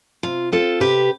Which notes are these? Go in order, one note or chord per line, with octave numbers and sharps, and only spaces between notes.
C3 F4
C4 F4 A4
C3 G4 B4